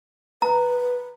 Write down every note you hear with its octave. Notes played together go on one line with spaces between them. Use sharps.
B4 A#5